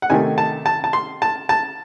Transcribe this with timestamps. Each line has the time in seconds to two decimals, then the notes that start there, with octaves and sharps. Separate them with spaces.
0.02 F#5
0.10 C3 D#3 A3 G#5
0.38 A5
0.66 A5
0.84 A5
0.93 C6
1.22 A5
1.49 A5